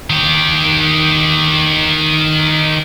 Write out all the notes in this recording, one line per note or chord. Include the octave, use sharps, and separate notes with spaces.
D#3 G4